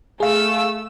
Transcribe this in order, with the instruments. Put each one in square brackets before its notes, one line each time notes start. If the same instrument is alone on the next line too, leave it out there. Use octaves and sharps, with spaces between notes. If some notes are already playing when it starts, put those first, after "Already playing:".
[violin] A3 E6 [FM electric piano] G#4 F5